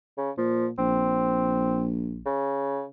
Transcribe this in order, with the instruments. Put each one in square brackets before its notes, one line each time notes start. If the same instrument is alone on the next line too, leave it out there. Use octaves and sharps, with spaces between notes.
[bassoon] C#3
[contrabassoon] A#2 [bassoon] F3
[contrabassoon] A#1 [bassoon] C4
[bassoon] C#3